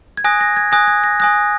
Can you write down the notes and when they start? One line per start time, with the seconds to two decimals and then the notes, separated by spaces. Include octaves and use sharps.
0.17 G#6
0.24 G#5 D#6 F#6 A#6
0.41 A#6
0.57 G#6
0.72 G#5 D#6 F#6 A#6
0.87 G#6
1.04 A#6
1.20 G#5 D#6 F#6 A#6